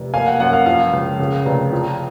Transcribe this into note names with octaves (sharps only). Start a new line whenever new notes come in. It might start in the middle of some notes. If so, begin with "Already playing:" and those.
Already playing: F1 C3
A#3 F5 G#5
F#5
F#2 F#5
F5
F3 F5
C#2
C#3
F1
F3